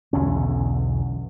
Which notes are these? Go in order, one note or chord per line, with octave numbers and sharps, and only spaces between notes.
B1 E2 D3 C#4